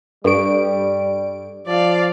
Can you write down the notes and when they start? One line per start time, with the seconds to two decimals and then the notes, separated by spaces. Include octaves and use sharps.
0.24 G2 G3 A4 D5 C#6 D7
1.67 F3 D5 F5